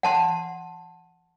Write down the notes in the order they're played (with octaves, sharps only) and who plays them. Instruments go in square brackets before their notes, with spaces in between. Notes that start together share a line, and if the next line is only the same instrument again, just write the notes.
[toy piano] F#5 A5 C6